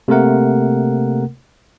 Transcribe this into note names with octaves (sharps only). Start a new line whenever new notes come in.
C3 A3 A#3 A#4 F#5